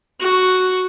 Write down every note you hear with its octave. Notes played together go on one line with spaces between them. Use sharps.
F#4